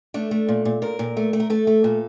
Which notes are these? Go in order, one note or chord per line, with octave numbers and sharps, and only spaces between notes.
A3 D4
A3
A#2
A#2
A#2 A#4
A#2
A3
A3
A#4
A3 A4
A3
A#2